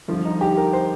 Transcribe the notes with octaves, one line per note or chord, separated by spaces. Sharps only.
G2 D3 F3 F4
D#4
G4
A#4
C5